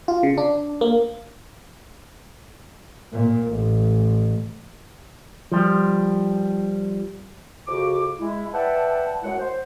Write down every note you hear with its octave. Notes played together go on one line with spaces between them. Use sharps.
F4
C#3
D4
A#3
A#2
A1
F3 G3
F2 C#3 F#4 D6
G#3 E4
B4 D5 E5 F#5 G5 A5
F#2 G#3 E4 F#5
C5